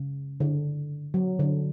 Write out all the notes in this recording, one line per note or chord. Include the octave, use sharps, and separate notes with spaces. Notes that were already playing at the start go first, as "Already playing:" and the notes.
Already playing: C#3
D3
F#3
D3